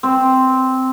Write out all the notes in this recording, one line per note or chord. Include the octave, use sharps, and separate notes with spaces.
C4